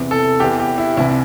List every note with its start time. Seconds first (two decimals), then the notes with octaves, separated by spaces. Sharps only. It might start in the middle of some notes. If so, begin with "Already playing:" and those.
Already playing: E2 C3 E3
0.11 A4
0.40 E2 E3 G4
0.59 G4
0.78 E4
0.97 C2 C3 E3 E4